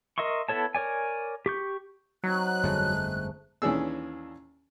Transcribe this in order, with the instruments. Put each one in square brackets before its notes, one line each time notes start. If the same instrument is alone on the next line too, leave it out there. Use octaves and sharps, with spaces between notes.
[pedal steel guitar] A#4 D#5 E5 C6 C#6
B3 E4 A4 C#5 A5
A#4 C#5 D5 G#5
G4 C#6 G6
[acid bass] F#3 [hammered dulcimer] C4 D#4 [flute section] F#6
[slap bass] G1 F2 [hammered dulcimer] G#3 A3
[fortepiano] D#2 E3 C#4 D4 G#4 E6